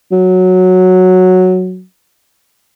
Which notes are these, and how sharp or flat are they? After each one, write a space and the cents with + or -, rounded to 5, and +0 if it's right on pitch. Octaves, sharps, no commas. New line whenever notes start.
F#3 -5